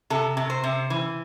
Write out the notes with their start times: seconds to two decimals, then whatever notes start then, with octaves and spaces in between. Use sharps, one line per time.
0.10 C3 A4
0.37 C3
0.50 C5
0.64 C3
0.90 E3